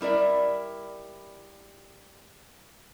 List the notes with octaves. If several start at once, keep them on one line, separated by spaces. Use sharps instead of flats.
G3 E4 A#4 D5